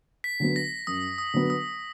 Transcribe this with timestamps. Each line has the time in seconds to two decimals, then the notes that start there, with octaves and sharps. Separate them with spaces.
0.24 B6
0.40 D3 F#3 B3
0.56 A#6
0.87 F#2 D#6
1.18 D#6
1.34 D3 F#3 B3
1.50 D#6